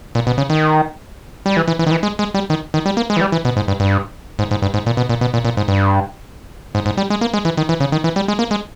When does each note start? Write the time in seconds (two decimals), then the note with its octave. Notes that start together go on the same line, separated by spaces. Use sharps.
0.15 A#2
0.27 B2
0.38 C#3
0.50 D#3
1.46 G3
1.57 E3
1.68 E3
1.79 E3
1.87 D#3
1.91 E3
2.03 G#3
2.19 G#3
2.34 G3
2.50 D#3
2.74 D#3
2.86 G3
2.97 A#3
3.10 G#3
3.17 E3
3.21 G3
3.32 E3
3.45 B2
3.56 G#2
3.68 G2
3.80 G2
4.39 G#2
4.51 G#2
4.62 G2
4.74 G#2
4.86 A#2
4.97 B2
5.09 A#2
5.21 B2
5.34 A#2
5.45 A#2
5.57 G#2
5.68 G2
6.75 G#2
6.86 G#2
6.97 G3
7.10 G#3
7.21 A#3
7.34 G#3
7.45 E3
7.57 D#3
7.69 E3
7.80 C#3
7.92 D#3
8.04 E3
8.16 G3
8.28 G#3
8.39 A#3
8.51 G#3